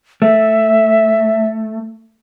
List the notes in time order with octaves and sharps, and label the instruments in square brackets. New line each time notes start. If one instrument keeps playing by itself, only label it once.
[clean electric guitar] A3 [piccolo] E5